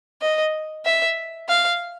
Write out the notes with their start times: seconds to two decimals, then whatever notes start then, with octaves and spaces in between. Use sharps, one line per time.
0.22 D#5
0.86 E5
1.49 F5